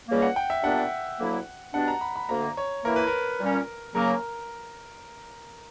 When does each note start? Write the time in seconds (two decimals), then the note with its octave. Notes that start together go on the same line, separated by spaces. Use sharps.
0.08 C#2 C#3 G3 A#3
0.22 F#5
0.36 G5
0.50 E5
0.63 A#2 G3 B3 D4 F#5
1.19 D2 D3 F#3 A#3 E4
1.73 B2 G3 B3 D4 F#5
1.88 A#5
2.01 B5
2.16 B5
2.29 D2 D3 A#3 A#5
2.57 C#5
2.84 E3 A#3 E4 A#4
2.96 B4
3.07 A#4
3.40 A#2 G3 C#4
3.94 C#3 F#3 A#3 A#4